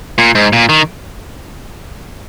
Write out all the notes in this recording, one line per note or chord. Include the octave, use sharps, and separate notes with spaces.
A#2
G#2
A#2
D#3